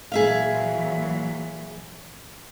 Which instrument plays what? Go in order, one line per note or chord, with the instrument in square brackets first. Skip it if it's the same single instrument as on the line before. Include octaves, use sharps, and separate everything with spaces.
[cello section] A#2 E3 F#3 [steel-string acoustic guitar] G#4 E5 F5